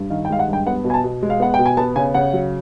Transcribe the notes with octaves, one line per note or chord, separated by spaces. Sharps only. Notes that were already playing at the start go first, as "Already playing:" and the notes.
Already playing: G2
D#3 F5
G5
G#3 F5
F#5
G2 G5
B3 F#5
B2
G#5
A5
B2
G#3
F5
B3 F#5
G5
B2
G#5
B3 A5
C#3 G#5
C#3 F#5
F#3